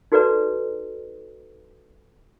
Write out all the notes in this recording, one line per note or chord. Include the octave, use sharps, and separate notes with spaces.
D#4 F#4 A4 B4 D5 A#5